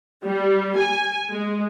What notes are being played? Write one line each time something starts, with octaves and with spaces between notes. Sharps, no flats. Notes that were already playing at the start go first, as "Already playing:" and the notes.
G3
G#5
G#3